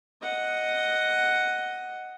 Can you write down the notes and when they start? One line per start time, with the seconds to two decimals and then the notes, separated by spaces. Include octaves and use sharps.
0.22 D#5 F#5